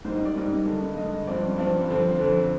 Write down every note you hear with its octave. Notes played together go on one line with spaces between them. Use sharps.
G#2 G3 A#3 C5
D#5
D5
G#2 G3 A#3 D#5
G2 D3 G#3
G2 D3 G#3 D#5
G2 F3 C4 D5
G2 F3 C4
F2 D3 F3 C4
F2 D3 F3 C4